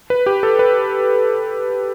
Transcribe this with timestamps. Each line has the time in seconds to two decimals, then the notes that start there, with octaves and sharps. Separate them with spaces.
0.10 B4
0.26 G4
0.43 A4
0.59 B4